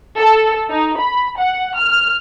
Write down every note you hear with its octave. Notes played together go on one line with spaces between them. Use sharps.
A4
D#4
B5
F#5
F6